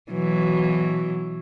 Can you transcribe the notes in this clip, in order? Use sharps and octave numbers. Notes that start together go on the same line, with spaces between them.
B2 E3 F#3